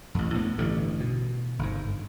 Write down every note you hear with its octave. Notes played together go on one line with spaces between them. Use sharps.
A1 F2
D2 A2 B3
A1 G2 D3
B2
G1 G#2